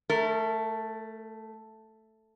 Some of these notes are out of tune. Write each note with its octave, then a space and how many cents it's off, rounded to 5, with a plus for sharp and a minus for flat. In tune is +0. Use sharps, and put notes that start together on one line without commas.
A3 +0 A#4 -35